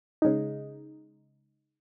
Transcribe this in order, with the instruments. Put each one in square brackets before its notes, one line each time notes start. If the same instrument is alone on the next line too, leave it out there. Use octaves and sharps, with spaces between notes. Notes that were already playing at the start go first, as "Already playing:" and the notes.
[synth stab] C#3 G#3 D#4